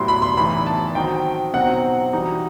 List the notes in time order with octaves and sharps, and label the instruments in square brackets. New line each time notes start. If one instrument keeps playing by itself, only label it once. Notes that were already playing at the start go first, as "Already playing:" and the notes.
Already playing: [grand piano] A2 F#3 B3 E4 G4 [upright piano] C6
[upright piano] B5
C6
[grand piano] A2 E3 B3 D#4 [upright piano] B5
[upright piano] A5
[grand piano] D#3 F#3 C4 D#4 F#4 [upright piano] G5
[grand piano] B2 F#3 C4 D#4 F#4 [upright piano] F#5
[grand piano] E3 G3 D#4 F#4